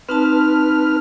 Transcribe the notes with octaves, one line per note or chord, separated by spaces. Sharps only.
C4 D#4 B4 A5 F6